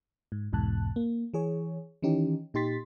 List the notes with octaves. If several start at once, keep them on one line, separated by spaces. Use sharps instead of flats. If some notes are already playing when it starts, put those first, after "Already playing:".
G#2
B1 E2 G#2 B2 A5 F#6
A#3
E3 G#4 C#5
D#3 E3 C#4 D#4 G4
A#2 D#4 G4 C6 A6 B6